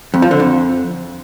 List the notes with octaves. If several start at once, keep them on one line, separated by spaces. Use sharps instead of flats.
F2
F3
D3
F2